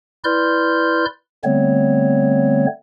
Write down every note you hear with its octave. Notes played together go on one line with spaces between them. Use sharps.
E4 B4 D5 C6 F6 G6
D3 G3 A3 B3 C4 C#5